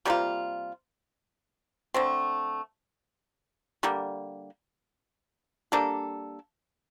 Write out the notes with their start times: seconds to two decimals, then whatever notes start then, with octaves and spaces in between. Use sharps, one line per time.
0.05 C3 G3 A#3 F4
1.94 D3 A3 C4
3.83 D3 G3 A#3
5.72 G3 A#3 D4 A4